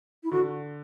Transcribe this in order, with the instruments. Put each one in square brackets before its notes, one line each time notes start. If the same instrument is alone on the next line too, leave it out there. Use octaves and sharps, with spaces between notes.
[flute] E4
[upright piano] D3 [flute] F#4